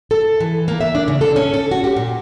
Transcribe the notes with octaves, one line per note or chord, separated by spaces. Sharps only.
A4
E3
A#3
E5
D4
C#3
A4
C#4
A4
F#4
G4
A#2